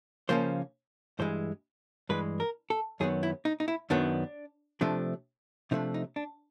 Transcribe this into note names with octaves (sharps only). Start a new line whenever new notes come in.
C#3 F3 A#3 C#4 C5
G2 E3 G#3 C5
G2 E3 G#3 B4
A#4
A4
F#2 D#3 F#3 B3 G#4
E4
D#4
D#4
E4
F#2 D#3 F#3 B3 D4
C3 F3 A3 D4
C3 F3 A3 D4 D#4
D#4
D4